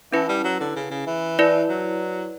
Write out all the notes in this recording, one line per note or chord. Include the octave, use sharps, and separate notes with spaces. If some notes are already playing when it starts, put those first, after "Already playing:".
E3 C#4 E4 B4
G3
F#3
D3
C#3
C#3
E3
E4 B4 D5
F#3